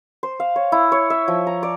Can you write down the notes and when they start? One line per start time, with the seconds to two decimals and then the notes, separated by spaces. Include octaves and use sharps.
0.23 C5
0.40 F5
0.56 C#5
0.72 E4
0.92 C#5
1.10 E5
1.28 F3
1.47 A#5
1.63 D5